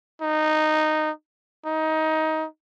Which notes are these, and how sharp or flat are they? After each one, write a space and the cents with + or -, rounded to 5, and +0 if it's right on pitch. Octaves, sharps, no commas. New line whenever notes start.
D#4 -10
D#4 +20